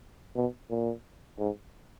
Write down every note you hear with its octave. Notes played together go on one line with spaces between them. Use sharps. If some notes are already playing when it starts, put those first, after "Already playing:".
B2
A#2
G#2